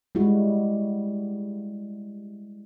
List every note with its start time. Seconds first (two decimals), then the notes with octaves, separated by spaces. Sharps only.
0.15 G3 G#3 E4 F#4